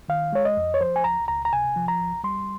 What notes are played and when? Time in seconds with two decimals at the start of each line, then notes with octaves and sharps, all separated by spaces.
0.08 D#3 F5
0.33 G#3 C#5
0.45 D#5
0.57 F2
0.74 C#5
0.80 F3 C5
0.96 G#5
1.04 C#2 A#5
1.28 C#2 A#5
1.45 A#5
1.53 C3 G#5
1.76 F3
1.88 A#5
2.00 C#2
2.24 G3 C6